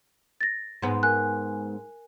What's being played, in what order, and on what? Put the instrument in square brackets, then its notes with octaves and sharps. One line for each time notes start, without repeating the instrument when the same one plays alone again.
[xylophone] A6 A#6
[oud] G#2 B3
[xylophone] A#4 G#5 F#6